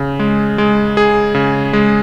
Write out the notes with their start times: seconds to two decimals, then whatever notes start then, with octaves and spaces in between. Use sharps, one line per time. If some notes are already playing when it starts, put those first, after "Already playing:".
Already playing: C#3
0.19 G#3
0.58 G#3
0.97 G#4
1.35 C#3
1.73 G#3